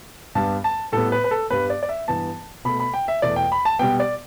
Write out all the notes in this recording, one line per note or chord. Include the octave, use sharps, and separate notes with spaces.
G2 G3 B3 A5
A5
A2 G3 B3 A4
B4
B4
A4
G2 G3 B3 B4
D5
D5
E5
G2 E3 B3 A5
B2 A3 B5
B5
G5
E5
E2 B2 A3 D5
G5
B5
A5
B2 G3 B3 G5
D5